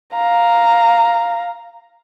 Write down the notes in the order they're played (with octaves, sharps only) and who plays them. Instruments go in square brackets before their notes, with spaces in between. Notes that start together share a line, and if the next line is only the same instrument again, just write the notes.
[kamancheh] F5 A#5